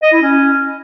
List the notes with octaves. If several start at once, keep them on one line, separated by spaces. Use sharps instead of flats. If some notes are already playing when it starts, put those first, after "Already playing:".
D#5
E4
C#4